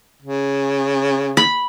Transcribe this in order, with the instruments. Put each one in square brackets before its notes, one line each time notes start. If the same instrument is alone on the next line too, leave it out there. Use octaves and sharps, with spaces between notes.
[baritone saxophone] C#3
[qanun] B5